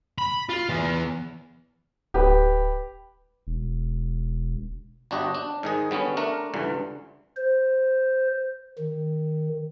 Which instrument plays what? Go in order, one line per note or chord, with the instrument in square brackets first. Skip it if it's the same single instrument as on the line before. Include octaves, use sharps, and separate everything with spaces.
[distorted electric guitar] B5
F4
E3 B3
[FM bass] D1 [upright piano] G4 B4
[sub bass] E1
[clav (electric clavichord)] G1 D4 F#4 G4 D#5
D4
G#2 D#3 G#4
D3 G3 B3 C#4
A3 D4 A#4
C#2 G2 D3 E3
[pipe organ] C5
D#3